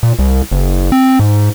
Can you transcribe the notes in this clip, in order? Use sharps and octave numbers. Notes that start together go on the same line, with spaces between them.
A#2
C2
F#1
C4
G#2